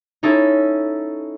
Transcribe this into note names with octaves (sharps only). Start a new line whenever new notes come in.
C#4 D#4 E4 A4